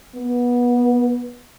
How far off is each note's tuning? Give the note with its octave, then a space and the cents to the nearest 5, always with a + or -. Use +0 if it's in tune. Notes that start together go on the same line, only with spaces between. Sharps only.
B3 -20